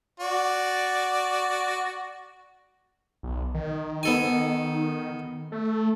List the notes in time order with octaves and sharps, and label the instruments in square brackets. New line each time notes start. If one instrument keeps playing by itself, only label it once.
[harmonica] F#4 D5
[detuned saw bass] B1
D#3
[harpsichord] B3 A4 G#5
[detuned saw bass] A3